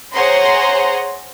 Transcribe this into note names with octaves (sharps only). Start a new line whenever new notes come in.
G#4 C5 C#5 F#5 A#5 C6